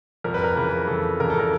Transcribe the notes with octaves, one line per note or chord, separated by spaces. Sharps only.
F2 A#4
B4
A#4
C#3 E3 B4
F2 A4
C#3 E3 A#4
A4
A#4